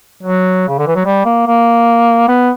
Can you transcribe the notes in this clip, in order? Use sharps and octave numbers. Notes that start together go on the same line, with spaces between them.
F#3
C#3
D3
E3
F#3
G3
A#3
A#3
B3